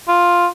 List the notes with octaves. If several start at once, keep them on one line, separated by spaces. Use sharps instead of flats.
F4